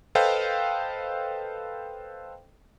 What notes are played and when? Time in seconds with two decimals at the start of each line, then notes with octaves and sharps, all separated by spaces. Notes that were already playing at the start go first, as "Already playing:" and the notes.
0.15 A4 B4 C5 D#5 F5 G5